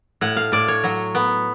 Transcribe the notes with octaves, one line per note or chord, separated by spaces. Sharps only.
A2 F#5
F5
A2 D5
C#5
F#3
B3